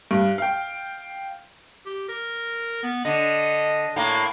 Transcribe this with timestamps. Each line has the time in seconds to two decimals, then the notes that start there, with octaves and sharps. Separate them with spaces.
0.11 G2
0.38 F5 G5
1.86 G4
2.09 A#4
2.83 B3
3.05 D3 D#5
3.96 A2 A#3